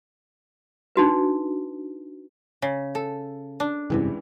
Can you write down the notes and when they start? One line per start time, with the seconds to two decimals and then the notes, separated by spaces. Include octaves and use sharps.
0.96 D4 D#4 F#4 B4
2.62 C#3
2.95 A4
3.60 D4
3.90 F1 C#2 G2 C3 E3